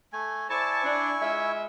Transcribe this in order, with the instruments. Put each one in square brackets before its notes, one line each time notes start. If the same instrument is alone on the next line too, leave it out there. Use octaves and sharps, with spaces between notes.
[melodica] A3 G#5
[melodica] E4 G#5 C#6 [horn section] C5 D5 A5
[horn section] D4
G#3 F4 E5